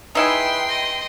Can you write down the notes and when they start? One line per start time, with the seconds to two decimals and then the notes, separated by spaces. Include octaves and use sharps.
0.15 D#4 E4 G#4 B4 G5 C6
0.68 D#5